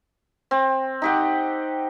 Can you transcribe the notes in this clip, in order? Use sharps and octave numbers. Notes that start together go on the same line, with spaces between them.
C4
D#4 G4 F#5